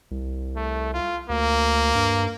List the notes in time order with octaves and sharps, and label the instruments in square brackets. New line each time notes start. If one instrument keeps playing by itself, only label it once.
[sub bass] C2
[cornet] A3
F4
[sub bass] D2 [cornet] A#3
[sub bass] G2